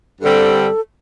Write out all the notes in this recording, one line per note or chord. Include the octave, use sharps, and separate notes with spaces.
G2 D3 G3 C4 A4